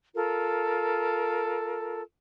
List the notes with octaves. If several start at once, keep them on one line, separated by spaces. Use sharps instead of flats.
F4 A4 A#4